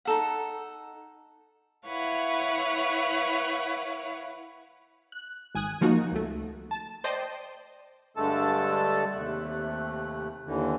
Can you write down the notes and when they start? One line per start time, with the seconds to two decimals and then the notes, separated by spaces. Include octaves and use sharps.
0.05 D#4 A4 F#5
1.88 E4 B4 C#5 F5 F#5
5.12 F#6
5.55 G#1 G#5 D#6 F#6
5.81 D#3 F3 A#3 D#4 F#4
6.12 C#2 A3
6.71 A5
7.04 C5 D5 D#5 G5 A5 C6
8.17 G2 D3 G#3 A3 A4 A5
9.13 D#2 C3 A3 F#6
10.46 D#2 D3 E3